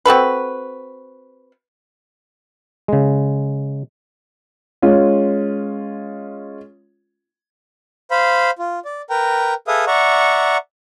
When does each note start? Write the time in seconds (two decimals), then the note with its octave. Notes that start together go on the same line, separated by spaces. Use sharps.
0.06 C4 F#4 A4 B4
2.88 C#3 G#3
4.82 G#3 C#4 F4
8.11 C5 F5 B5
8.59 F4
8.85 D5
9.10 A#4 B4 G5 A#5
9.68 G#4 A4 B4 E5 F5 D#6
9.87 D5 E5 F#5 A#5 C#6